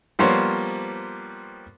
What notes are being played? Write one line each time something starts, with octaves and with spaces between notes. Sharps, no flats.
F3 G3 A#3 B3 C5 C#5